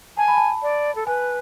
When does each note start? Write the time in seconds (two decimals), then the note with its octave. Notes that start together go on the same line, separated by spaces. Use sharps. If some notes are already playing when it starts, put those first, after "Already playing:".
0.17 G#5 A5
0.28 B5
0.37 A5
0.63 D5
0.95 A4
1.07 B4 G#5